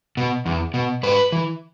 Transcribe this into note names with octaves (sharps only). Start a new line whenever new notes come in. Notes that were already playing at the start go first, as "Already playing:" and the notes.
B2
E2
B2
G#2 B4
E3